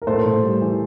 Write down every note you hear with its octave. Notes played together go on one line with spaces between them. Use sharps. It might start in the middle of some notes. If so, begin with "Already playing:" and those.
A#4
A2 A4 C5
A2
G3
E3